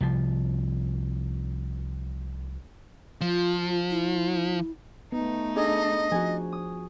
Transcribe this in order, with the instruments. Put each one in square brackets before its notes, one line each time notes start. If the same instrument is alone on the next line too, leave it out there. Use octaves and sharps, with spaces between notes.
[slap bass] C2 F3
[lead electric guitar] F3 [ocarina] F4
[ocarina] E4
[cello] A3 D#4 [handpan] B3
[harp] D4 G#4 A4 [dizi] D#5
[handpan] F3 [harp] F#4 G#4 G#5
[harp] D#6